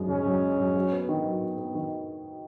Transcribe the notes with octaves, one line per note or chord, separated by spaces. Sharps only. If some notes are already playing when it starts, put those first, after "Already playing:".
Already playing: F#2 G#3 D#4
C#3 C#4
F#2
G#3
F#2
F#3
B3
D#3
F#3
B3
B3
D#3